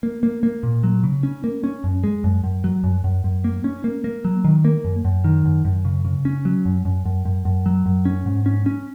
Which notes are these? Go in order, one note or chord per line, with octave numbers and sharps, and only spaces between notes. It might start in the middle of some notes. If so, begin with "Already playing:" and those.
A#3
A#3
A#3
A#2
F#3
C#3
C#4
A#3
C#4
F#2
G#3
F#2
F#2
F#3
F#2
F#2
F#2
A#3
C#4
A#3
A#3
F#3
D#3
A#3
F#2
F#2
D#3
F#2
F#2
C#3
C#3
C#4
F#3
F#2
F#2
F#2
F#2
F#2
F#3
F#2
C#4
G#2
C#4
C#4